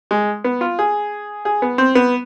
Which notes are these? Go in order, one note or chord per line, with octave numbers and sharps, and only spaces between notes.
G#3
B3
F4
G#4
G#4
B3
C4
B3